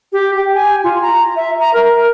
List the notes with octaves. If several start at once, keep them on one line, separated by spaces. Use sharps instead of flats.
G4
G5
G#5
F4
A#5
E5
A#5
A#4